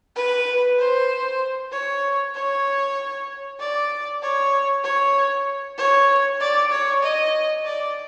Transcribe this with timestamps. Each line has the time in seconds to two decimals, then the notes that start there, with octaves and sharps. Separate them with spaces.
0.16 B4
0.78 C5
1.72 C#5
2.34 C#5
3.59 D5
4.22 C#5
4.83 C#5
5.78 C#5
6.40 D5
6.71 C#5
7.02 D#5
7.65 D5